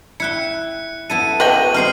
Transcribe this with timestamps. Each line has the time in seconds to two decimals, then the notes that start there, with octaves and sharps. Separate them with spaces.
0.20 E4 E5 G5 F#6 C#7
1.10 B3 E4 A4 D#7
1.40 F#4 B4 D#5 G5 F#7
1.74 G#3 C4 D#4 F6 C7